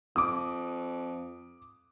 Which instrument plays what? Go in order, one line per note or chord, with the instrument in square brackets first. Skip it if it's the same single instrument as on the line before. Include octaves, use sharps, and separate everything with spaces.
[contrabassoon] F2 [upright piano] D6 D#6